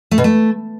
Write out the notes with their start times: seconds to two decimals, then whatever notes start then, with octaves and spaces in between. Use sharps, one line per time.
0.11 A3
0.18 B2
0.24 A3